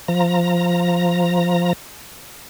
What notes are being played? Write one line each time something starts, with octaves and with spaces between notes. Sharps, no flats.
F3 A#5